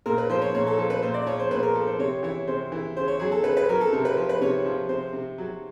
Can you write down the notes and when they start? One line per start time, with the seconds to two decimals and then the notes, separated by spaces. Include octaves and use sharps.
0.06 A#2 A#4
0.18 B4
0.30 F3 C5
0.42 C#5
0.54 A#2 C#5
0.67 A4
0.78 F3 A4
0.90 B4
1.02 A#2 C5
1.14 D5
1.26 F3 C#5
1.39 C5
1.51 A#2 B4
1.63 A#4
1.75 F3 A4
1.87 C5
1.99 C3 C#5
2.23 E3 C#5
2.47 C3 C5
2.72 E3
2.96 C#3 C5
3.08 C#5
3.20 F#3 G#4
3.32 A4
3.44 C#3 B4
3.57 B4
3.69 F#3 A#4
3.81 A4
3.93 C3 A#4
4.05 B4
4.17 F3
4.29 B4
4.41 C3 C#5
4.66 F3
4.89 C3 C5
5.13 C3
5.38 F#3